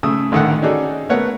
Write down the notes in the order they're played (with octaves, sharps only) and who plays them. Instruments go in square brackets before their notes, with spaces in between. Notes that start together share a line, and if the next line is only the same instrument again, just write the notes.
[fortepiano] C#3 A3 D#6 E6
A1 D3 D#3 A4 F#5
C#4 D#4 F#4 G#4 A4 D5
A3 B3 A#4 C#5 F#5